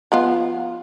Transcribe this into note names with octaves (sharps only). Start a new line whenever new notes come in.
F3 B3 F4